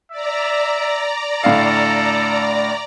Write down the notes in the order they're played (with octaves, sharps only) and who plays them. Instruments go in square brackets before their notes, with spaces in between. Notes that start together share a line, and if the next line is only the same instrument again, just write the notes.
[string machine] D5 A#5 [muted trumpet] E5
[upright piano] A2 D3 F5 [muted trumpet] A4